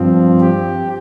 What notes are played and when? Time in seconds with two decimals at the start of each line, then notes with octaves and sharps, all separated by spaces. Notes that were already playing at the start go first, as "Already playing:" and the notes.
Already playing: G2 F3 C4
0.40 G4